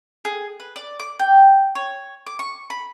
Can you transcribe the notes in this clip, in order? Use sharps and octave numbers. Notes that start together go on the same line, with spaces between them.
G#4
B4
D5
D6
G5
C#5
D6
C#6
B5